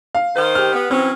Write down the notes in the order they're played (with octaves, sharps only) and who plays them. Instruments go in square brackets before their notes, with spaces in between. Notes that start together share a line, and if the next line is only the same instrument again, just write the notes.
[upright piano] F5
[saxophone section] D#3 C5
[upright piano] G4 F6
[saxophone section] B3
[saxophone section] E3 F#3 C#4 [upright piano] C4